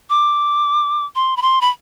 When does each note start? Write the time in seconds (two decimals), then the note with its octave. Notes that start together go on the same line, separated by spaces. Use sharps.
0.10 D6
1.15 C6
1.37 B5
1.42 C6
1.61 B5